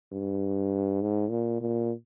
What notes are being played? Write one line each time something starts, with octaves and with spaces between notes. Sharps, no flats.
G2
G#2
A#2
A#2